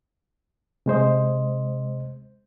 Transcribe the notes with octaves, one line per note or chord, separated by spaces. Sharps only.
C3 G#3 C5 D#5